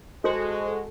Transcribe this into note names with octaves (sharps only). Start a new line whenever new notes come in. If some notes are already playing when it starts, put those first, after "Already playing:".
G#3 F#4 A4 C5 D#5